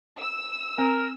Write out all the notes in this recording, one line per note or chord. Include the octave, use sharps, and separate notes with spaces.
E6
C4 A#4